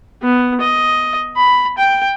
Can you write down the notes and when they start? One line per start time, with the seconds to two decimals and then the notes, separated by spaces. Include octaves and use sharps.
0.23 B3
0.60 D#5
1.36 B5
1.78 G5